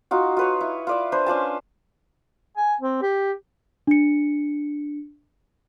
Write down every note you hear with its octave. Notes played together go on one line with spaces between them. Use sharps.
D#4 F4 F#4
F4 B4 C#5
E4
F4 D5 E5
D4 B4 C5
C#4 D4 F4 A5
G#5
C4
G4
D4 C#7